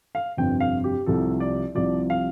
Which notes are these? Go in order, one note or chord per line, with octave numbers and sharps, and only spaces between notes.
F5
G1 F2 C3 G5
F5
G4
C2 C3 F3 A4
D5
C2 C3 F3 D5
F5